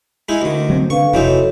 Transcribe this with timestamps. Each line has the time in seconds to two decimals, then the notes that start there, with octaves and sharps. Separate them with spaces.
0.29 G#3 D#4 E4
0.42 D2 D#3
0.70 F#3 C4
0.90 D3 B4 F5 C#6
1.14 F1 E3 C4 D#4 F#4 A4 C#5